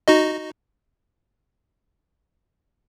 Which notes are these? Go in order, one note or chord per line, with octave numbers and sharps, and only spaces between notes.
D#4 F#4 D#5